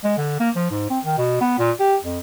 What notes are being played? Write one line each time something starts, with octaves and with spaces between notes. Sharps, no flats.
G#3
D3
A#3
F3
G#2
C4
D#3
B2
B3
A#2
G4
F2